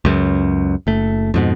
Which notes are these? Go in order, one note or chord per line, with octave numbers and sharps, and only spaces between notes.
C#2 F#2
F#1 A3
F2 G#2 B2